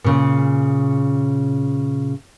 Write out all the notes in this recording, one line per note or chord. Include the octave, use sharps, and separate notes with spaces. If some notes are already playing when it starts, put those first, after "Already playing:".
A#2 C#3